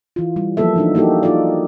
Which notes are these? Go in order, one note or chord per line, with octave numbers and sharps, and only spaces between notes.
E3 F4
G3
F3 F#3 A#3 B3 A4 E5
E3 D4 D#4
A#3 D#4 F#4 G4 A4
D#4 F4 A4 D5